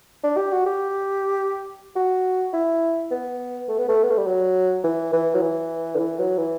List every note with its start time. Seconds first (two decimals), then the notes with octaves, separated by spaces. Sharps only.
0.23 D4
0.37 G4
0.52 F#4
0.66 G4
1.96 F#4
2.53 E4
3.11 B3
3.69 A3
3.78 B3
3.89 A3
4.03 B3
4.10 A3
4.18 G3
4.27 F#3
4.84 E3
5.13 E3
5.34 F#3
5.41 E3
5.95 D3
5.99 E3
6.19 F#3
6.38 E3